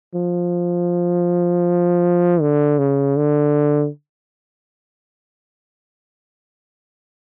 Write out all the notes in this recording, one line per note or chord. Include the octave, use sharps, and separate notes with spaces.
F3
D3
C#3
D3